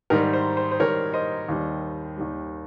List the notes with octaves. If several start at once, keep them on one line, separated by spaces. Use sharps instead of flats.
G#2 D#3 G3 A#4
C5
C5
C5
G#2 D#3 G3 A#4 C#5
C5 D#5
D#2 D#3 G3
D#2 D#3 G3